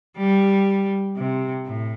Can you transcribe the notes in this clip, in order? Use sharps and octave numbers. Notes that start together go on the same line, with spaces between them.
G3
C3
A2